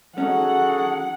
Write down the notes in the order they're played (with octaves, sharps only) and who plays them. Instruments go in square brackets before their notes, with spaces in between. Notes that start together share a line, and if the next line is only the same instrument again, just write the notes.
[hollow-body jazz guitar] C#4 D#4 [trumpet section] F#4 G#4 A4 [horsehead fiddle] F#5